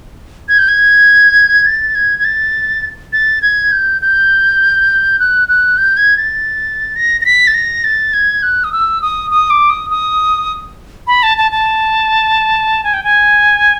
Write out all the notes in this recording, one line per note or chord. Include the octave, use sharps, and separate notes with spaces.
G#6
G6
G#6
A6
G#6
G#6
A6
A6
G#6
G6
G6
F#6
F#6
G6
G#6
A6
A#6
A#6
B6
A6
A#6
A6
G#6
F#6
D#6
E6
D#6
D#6
D6
D#6
D#6
B5
A5
A5
A5
G#5
G5
G#5